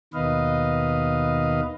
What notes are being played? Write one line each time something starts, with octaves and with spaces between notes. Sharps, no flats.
D#2 B2 D#3 B4 D#5 F5